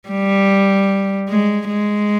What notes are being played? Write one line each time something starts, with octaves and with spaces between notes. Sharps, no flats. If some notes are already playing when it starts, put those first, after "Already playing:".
G3
G#3
G#3